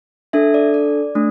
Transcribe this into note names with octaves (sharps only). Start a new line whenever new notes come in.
D4 A4 E5
D5
D5
A3 D4